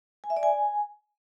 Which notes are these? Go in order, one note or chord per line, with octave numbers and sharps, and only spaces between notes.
G#5
E5
D5
G#5